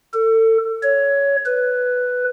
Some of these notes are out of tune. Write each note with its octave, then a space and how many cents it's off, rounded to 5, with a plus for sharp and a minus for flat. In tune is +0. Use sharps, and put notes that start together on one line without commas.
A4 +30
C#5 +15
B4 +5